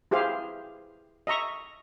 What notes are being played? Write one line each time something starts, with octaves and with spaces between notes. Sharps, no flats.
E4 G4 G#4 C5 F5
D#5 E5 A#5 C#6